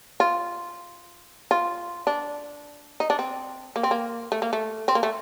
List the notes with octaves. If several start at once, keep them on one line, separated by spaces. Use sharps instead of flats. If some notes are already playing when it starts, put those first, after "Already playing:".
F4
F4
D4
D#4
D4
C4
A#3
C4
A#3
A3
A#3
A3
C4
A#3
A3